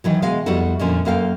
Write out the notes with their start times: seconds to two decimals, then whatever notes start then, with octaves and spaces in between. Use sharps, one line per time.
0.04 D#3 E3 F#3
0.22 B2 G#3 D#5 F5
0.46 F2 G3 B3 E4 F#4 A4
0.79 F2 A#2 D3 F3 C#4
1.05 F#2 A#3 A4 F5 G5